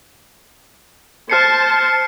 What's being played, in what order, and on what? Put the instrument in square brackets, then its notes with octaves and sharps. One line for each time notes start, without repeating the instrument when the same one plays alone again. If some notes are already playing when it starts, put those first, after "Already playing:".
[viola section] C5 A5 [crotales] F6 C7 C#7